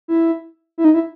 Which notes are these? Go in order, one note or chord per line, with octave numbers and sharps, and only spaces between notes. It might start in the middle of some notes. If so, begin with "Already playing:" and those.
E4
E4
D#4
E4